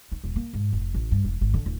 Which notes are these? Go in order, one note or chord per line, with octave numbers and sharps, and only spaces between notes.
D#4
D#1
A#3
G#2
F1
A1
G2
E1
G#1
D3
D1